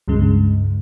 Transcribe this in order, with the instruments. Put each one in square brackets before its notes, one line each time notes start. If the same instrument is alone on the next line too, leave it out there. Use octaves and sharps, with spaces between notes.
[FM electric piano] C#2 G2 C#3 G#3